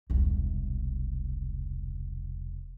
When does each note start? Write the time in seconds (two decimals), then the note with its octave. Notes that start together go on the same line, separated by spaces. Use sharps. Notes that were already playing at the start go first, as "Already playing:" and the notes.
0.10 E1 C2